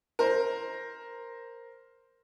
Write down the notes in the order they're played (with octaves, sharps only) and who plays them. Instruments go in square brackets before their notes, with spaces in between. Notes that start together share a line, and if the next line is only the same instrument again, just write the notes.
[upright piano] A#4 C5